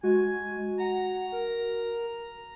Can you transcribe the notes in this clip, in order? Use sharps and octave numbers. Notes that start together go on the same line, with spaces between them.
G#3 F#4 G#5
F#5 A#5
A#4